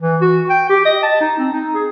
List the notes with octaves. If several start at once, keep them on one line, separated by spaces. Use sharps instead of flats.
E3
F#4
G5
G4
D#5
A5
D#4
C4
D#4
G#4